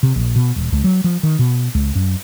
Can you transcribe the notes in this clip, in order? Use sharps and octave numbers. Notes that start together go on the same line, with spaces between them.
C3
A#1
B2
D#1
C#2
F#3
F3
D#3
B2
C#2
F#2